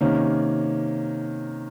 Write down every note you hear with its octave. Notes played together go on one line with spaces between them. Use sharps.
C3 D#3 A#3 C#4